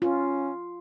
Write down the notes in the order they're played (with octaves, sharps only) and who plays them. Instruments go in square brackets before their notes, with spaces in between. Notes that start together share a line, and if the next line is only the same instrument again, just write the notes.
[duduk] C#4 [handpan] F4